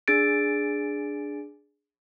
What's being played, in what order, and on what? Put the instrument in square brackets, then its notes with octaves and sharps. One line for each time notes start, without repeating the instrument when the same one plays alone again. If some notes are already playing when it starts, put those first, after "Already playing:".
[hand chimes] D4 G#4 A6 D7